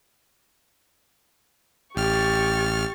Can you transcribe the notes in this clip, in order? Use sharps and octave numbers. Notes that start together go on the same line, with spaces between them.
A1 G4 C#6 F6 A6